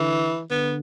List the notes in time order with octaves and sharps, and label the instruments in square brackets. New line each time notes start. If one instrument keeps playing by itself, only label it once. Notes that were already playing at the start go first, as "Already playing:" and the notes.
Already playing: [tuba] D3 [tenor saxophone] E3
[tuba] D3 [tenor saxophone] B3